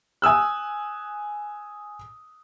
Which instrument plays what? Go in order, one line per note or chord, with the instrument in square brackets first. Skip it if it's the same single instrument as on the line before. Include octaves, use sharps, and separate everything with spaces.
[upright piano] G#5 D#6 E6 F#6